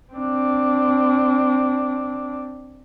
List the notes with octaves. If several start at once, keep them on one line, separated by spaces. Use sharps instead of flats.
C4 D4